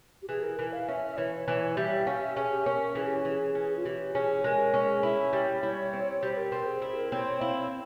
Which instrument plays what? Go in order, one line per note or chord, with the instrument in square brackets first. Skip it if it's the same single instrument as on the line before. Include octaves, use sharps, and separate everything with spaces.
[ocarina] G4
[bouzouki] E3 [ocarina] G#4
[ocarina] A#4
[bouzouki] E3 [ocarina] A#4
[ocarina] F5
[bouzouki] C#4 [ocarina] E5
[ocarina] E5
[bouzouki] E3 [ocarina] C#5
[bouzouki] E3 [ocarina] C#5
[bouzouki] G3 [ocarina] E5
[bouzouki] C#4 [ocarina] F5
[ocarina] E5
[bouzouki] C#4 [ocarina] G#4
[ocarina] G4
[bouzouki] C#4 [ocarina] A#4
[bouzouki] E3 [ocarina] G#4
[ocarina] G4
[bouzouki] E3 [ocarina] G#4
[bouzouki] C#4
[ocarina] F4
[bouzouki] E3 [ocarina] G4
[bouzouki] C#4 [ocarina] G#4
[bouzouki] G#3 [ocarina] A#4
[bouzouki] C#4
[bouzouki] E4 [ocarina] E5
[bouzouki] G3
[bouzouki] E4 [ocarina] C#5
[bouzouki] C4
[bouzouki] G3 [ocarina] C5
[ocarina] A#4
[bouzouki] C4 [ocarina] A#4
[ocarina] G#4
[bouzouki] E4 [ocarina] G#4
[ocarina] A#4
[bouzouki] C4 [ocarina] C#5
[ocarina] C#5
[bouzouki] E4 [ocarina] F5